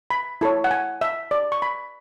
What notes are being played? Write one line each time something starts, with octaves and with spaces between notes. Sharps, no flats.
B5
E4 A4 C#5
F#5
G#5
E5
D5
C#6
B5